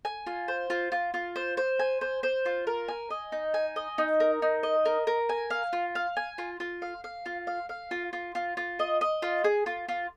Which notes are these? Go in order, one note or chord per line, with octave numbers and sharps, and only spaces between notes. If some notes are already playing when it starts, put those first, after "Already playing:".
G#5
F4
C5
F4
F4
F4
C5
C5
G#5
C5
C5
F4
A#4
G#5
D#5
D#4
G#5
D#5
D#4
A#4
D#4
D#5
A#4
A#4
G#5
F5
F4
F5
G#5
F4
F4
F5
F5
F4
F5
F5
F4
F4
F4
F4
D#5
D#5
F4
G#4
F4
F4